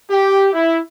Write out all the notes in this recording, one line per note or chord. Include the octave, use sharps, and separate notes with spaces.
G4
E4